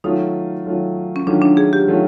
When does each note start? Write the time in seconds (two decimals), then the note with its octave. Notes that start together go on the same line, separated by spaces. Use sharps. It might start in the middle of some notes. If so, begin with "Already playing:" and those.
0.04 D#3 F#3 A3 C#4 D#4 F4
0.65 D#3 F#3 A3 C#4 F4
1.16 C#4
1.27 D#3 F#3 A3 C#4 D4 F4
1.42 D4
1.57 G#4
1.73 G4
1.88 D#3 F#3 A3 C#4 F4